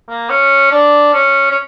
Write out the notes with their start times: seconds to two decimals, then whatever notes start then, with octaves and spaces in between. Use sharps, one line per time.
0.09 A#3
0.30 C#4
0.71 D4
1.14 C#4
1.51 C#4